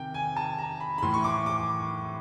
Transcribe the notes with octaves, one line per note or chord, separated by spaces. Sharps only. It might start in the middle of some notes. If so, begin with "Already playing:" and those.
Already playing: C3 D#3 G5
G#5
A5
A#5
B5
B5
A2 E3 C6
C#6
D6
D6